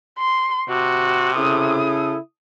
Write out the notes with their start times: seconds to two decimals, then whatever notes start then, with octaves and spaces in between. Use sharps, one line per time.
0.18 C6
0.69 C3 F#4
1.36 C#3 E4 A4 D#6